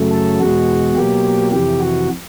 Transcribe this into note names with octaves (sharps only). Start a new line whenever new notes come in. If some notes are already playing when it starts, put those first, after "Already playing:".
Already playing: F#2 C#3 F#3 A3
A4
E2 B2 G#3 F#4
B2 F#3 A#3 G4
F2 C3 E3 G4
F#4